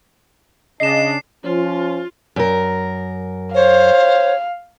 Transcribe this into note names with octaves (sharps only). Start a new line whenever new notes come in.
C#3 D4 D#5 C7 E7
F3 C#4 F4
F#2 A#4
C5 C#5 F5